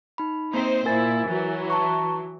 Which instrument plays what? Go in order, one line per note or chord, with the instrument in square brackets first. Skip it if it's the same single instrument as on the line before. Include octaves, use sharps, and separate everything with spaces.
[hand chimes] D#4 B5
[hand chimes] A#3 [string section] C4 D#4 C5
[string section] A#2 E4 [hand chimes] A#4 G#5 A6
[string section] E3 F#3
[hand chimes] A5 A#5 C#6